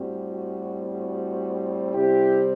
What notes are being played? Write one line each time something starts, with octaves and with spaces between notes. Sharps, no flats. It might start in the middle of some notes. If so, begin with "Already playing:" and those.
Already playing: A2 G3 C4 F#4
F#4
F#4
C3 G3 C4 E4 G4